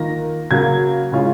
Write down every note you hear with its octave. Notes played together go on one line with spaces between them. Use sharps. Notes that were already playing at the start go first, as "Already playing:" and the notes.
Already playing: D#3 A#3 F4 A#6
C#3 F#3 A#3 G#6
C#3 G#3 C#4 F4